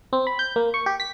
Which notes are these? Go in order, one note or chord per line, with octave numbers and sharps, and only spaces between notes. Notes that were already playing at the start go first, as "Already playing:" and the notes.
C4
B5
G6
A#3
C#6
G4
B6